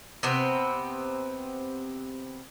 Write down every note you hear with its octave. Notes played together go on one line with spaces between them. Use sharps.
C3 B3 C4